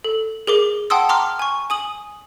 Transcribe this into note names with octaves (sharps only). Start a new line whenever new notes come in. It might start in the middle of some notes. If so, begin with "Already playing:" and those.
A4
G#4 A#4 D6
F#5 G5 A5 C6 D#6 E6
A#5 C6 D6 F6
G#5 C#6
G#5 D#6 F#7